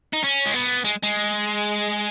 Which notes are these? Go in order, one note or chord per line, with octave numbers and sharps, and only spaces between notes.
D#4
C#4
G#3
B3
G#3
G#3